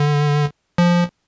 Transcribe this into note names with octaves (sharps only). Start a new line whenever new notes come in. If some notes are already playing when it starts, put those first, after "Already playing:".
Already playing: D3
F3